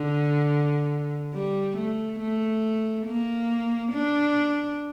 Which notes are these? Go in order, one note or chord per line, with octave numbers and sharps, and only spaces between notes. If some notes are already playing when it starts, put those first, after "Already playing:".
Already playing: D3
G3
A3
A3
A#3
D4